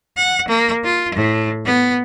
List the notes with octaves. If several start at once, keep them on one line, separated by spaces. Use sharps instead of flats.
F#5
A#3
F4
A2
B3